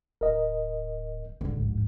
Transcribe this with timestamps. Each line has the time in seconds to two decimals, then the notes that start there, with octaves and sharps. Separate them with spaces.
0.21 D1 A#4 D#5
1.41 D1 G#2 D3
1.60 A#1